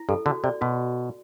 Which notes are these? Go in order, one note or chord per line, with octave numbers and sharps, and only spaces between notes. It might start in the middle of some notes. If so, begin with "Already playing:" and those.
Already playing: E4
G2 A4
D3 F#4
C3 D5
B2 F#4